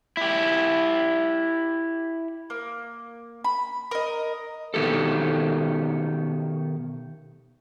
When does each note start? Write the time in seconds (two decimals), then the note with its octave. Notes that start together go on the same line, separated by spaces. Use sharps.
0.17 E4 G4
2.50 A#3
3.44 B5
3.91 A#4 D#5
4.74 B2 D#3 G#3 G4 A4